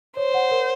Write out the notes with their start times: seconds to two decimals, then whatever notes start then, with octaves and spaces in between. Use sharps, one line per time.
0.17 C5 C#5
0.34 F#5
0.51 A#4